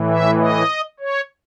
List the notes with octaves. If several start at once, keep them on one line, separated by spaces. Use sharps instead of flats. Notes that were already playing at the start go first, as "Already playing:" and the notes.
Already playing: A2 E3
E5
D#5
C#5